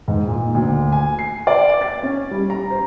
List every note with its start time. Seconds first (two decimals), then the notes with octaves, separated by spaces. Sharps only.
0.08 G#2
0.27 A#2
0.54 D2
0.92 G#5
1.19 C7
1.47 D5
1.81 A6
2.03 C#4
2.31 G3
2.50 A#5
2.71 C5